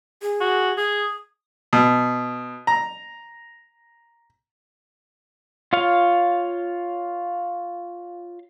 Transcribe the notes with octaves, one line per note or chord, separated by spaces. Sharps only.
G#4
F#4
G#4 D#6
B2
A#5
F4 C#5 F5